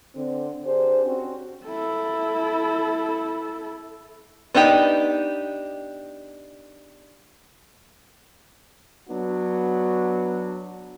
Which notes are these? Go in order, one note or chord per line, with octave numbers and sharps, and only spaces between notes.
D3 C4
D4 G4 G#4 C5
C4 C#4 F#4
E4 A4
B3 D4 D#4 G4
F#3 B3 D4 F#4